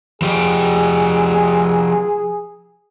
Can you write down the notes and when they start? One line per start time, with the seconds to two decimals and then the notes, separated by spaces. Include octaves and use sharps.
0.22 F3 G4 G#4